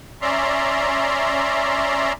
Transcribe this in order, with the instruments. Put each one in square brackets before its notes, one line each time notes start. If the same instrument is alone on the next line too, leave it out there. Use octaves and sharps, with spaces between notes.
[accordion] C#4 D5 E5 A#5 C6